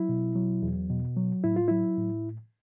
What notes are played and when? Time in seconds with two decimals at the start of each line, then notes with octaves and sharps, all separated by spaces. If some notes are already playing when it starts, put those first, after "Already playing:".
Already playing: F#3 E4
0.09 B2
0.35 F#3
0.63 E2
0.90 B2
1.17 F#3
1.44 A2 E4
1.56 F4
1.68 F#3 E4
1.98 A2